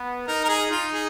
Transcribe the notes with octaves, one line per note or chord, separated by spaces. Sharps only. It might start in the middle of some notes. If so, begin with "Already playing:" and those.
Already playing: B3
D#4 A#4
A#4
G#4
D#4 F4
G#4